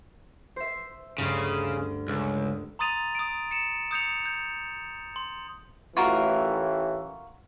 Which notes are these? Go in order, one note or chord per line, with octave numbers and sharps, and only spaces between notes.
C5 E5
D2 G2 C#3
C#2
A#5 C6 D#6 A6 D#7 F7
D#6 D7
C#7 E7
D#6 G6 C#7 F7
G6
C6
A1 A2 E3 F4 F#4 A#4